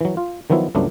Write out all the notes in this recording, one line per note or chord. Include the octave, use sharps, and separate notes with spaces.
E3 F#3
F4
D#3 F3 F#3 B3 E4
C#2 G2 F#3 A3 B3 D4